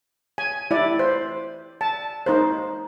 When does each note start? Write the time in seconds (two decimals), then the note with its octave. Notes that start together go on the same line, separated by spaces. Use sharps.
0.38 G#5
0.71 E4 D5
0.99 C5
1.81 A5
2.26 D#4 A#4 C5